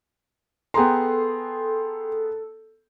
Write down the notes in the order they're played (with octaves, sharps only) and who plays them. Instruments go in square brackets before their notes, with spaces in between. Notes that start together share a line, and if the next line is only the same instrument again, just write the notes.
[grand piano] B3 G#4 A#5 [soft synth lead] A4 [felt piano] G5 C6